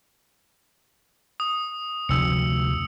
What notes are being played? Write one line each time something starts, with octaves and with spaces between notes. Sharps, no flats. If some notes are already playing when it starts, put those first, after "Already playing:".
D#6
F1 D2 E6 C#7